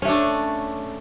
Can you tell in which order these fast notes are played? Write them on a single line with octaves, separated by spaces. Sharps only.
C#4 A3 D4